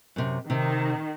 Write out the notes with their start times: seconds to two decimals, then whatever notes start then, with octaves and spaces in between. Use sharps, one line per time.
0.16 F#2 C3
0.50 C3 D#3